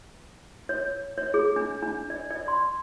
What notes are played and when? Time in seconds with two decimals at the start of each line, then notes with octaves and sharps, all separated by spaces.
0.69 C#5
1.18 C#5
1.34 G#4
1.56 D4
1.83 D4
2.10 D5
2.31 D5
2.48 C6